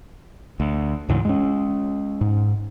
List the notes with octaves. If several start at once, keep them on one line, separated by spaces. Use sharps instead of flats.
D2
D2 G#2 C#3 E3
G#3 C#4
G#2